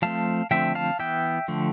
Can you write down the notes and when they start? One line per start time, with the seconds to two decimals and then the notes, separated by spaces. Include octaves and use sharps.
0.02 F3 A3 C4 F5 A5
0.51 D3 F3 A3 C4 E5 G5
0.75 F5 A5
0.99 E3 B3 E5 G5
1.48 D3 F3 A3